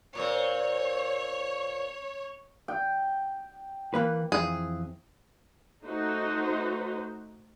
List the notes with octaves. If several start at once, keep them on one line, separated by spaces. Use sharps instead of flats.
A#2 C4 C#5
G5
E3 A#3 B4
F2 E3 F3 G#4
A3 D#4 F#4 C5